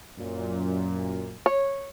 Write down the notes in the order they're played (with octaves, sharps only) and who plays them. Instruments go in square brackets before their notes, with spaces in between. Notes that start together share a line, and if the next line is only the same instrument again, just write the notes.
[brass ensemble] F#2 A#2
[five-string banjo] C#5